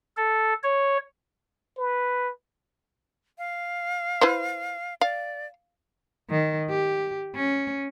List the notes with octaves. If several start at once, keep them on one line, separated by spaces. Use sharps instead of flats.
A4
C#5
B4
F5
E4 B4 C5
D5 F5
D#3
G4
C#4